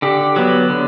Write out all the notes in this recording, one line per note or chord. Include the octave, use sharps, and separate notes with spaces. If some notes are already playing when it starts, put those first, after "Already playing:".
D3 G4
F#3 B3
D3